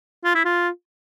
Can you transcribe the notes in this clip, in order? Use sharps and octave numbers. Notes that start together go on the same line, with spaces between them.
F4
E4
F4